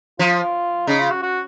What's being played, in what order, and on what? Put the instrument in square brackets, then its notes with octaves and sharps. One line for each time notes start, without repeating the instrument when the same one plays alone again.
[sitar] F3 [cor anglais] F4
[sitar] C#3 [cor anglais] D#4
[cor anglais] F4
F#4
F#4